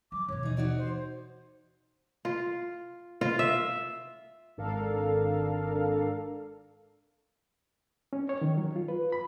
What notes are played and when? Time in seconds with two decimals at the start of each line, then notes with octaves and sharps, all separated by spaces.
0.12 F#3 D6
0.28 D#2 B2 C#5
0.43 E3 D#4
0.57 D#4 F#4 D5
0.78 C5
2.25 F4
3.21 F4
3.39 E5
4.57 G#1 D4 A4 A#4 F5
8.13 C#4
8.29 C#5
8.41 D#3
8.57 F#3
8.76 F4
8.88 B4
9.12 B5